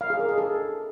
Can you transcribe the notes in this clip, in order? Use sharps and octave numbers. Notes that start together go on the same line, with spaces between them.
F5
G#4
A#4
G#4
A4